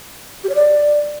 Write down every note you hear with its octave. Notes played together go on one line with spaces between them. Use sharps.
G4
C#5
D5